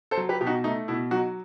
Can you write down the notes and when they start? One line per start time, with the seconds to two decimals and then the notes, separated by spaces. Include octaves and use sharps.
0.11 A4 C5
0.17 F#3
0.29 G4 B4
0.41 B2 G4
0.47 D#4 F#4
0.64 A3 D#4
0.88 B2 E4
1.11 F#3 D#4 F#4